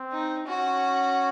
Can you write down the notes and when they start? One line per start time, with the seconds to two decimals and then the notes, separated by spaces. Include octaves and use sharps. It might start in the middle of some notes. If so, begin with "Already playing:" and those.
Already playing: C4
0.12 D#4
0.47 C#4 F#4